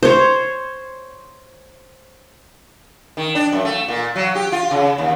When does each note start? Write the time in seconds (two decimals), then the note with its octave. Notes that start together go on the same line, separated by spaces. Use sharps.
0.03 C5 C#5
3.17 D#3
3.35 D4
3.52 F#2
3.65 A3
3.88 A#2
4.16 F#3
4.35 G4
4.52 F4
4.71 C#3
4.98 D#2